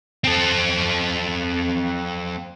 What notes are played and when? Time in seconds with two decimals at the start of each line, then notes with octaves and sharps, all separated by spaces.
0.24 C4 A4